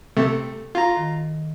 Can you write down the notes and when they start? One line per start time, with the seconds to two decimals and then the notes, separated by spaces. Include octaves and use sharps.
0.17 C3 A3 A4
0.75 F4 A#5
0.97 D#3